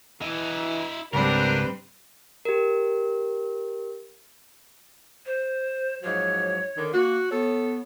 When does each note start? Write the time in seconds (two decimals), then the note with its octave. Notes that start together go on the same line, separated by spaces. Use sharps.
0.21 E3 E4 D#5
1.13 C#2 G#2 G3 C4 D4 G4 A#4 B4
2.45 G4 A#4
5.26 C5
6.02 G#2 F3 F#3 C#5
6.76 D3 D#3
6.93 A#3 F#4
7.31 B3 A4 C#5